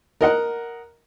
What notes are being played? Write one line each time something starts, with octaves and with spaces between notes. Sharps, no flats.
A#4 D#5 F#5